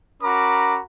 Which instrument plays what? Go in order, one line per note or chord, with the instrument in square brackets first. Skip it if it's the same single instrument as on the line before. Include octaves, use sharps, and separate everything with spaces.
[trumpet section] C#4 F#4 A#4 A#5 B5 D6